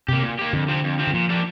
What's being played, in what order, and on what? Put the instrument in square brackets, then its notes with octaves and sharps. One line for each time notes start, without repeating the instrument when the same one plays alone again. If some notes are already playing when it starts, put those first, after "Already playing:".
[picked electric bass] C3 [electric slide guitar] A#3 G4
[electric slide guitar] A#2
A#3 G4
[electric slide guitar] F2 [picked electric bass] D3
[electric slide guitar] C3 F3 C4
F2
C3 F3 C4
[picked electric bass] D3
[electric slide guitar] A#2 [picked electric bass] F3
[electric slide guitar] G3 A#3 D4